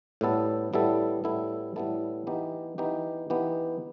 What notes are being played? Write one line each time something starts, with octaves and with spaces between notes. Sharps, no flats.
A2 G3 B3 E4 A4
A2 G3 B3 E4 A4
A2 G3 B3 E4 A4
A2 G3 B3 E4 A4
E3 B3 D#4 G4
E3 B3 D#4 G4
E3 B3 D#4 G4